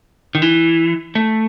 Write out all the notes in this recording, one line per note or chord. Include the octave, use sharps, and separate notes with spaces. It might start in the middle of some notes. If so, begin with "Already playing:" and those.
D#3
E3
A3